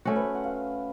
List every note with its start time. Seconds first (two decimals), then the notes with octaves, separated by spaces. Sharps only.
0.05 A3 C#4 F#4 C5
0.16 B4
0.35 F#5
0.44 F5